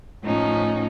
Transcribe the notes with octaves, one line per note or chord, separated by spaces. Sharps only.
A2 F3 C#4 D#4